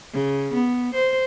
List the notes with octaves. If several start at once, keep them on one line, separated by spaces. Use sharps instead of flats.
C#3
B3
C5